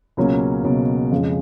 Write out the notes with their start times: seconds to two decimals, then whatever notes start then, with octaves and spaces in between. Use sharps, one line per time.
0.17 C#2 B2 F#3 A#3 C#4
0.64 C#2 B2 F#3 A#3 C#4
1.12 F2 C#3 F3 G#3